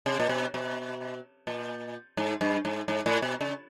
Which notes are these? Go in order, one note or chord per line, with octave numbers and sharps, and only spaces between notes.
C3
A#2
B2
B2
A#2
G#2
G2
G#2
G#2
A2
B2
C#3